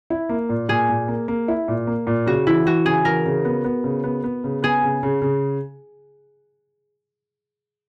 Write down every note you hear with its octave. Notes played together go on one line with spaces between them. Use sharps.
E4
A#3
A#2
A#2 G#4
A#2
A#3
A#3
E4
A#2
A#3
A#2
C#3 F#4
E3 E4
E3 F#4
C#3 G#4
E3 A#4
C#3
B3
B3
C#3
B3
B3
C#3
B3 G#4
C#3
C#3
C#3